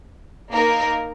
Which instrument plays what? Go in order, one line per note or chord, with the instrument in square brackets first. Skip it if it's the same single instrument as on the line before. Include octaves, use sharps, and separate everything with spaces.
[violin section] A#3 D#4 A#4